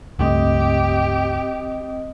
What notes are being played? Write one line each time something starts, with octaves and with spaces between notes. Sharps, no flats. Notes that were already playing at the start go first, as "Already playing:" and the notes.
C#2 G2 A3 C4 G4 D#5 D#6